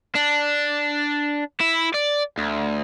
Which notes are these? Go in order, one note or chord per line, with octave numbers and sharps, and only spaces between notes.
D4
E4
D5
D2